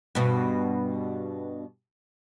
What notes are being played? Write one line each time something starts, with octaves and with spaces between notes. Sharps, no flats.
G2 B2